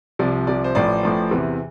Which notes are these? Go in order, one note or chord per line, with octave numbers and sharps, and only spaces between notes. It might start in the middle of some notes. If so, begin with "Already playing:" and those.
C2 C3 F3 D5
C2 C3 F3 D5
C5
A1 A2 F3 D5
A1 A2 F3
E2 C3 E3